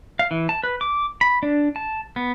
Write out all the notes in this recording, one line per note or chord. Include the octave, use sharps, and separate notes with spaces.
F5
E3
A5
B4
D6
B5
D4
A5
B3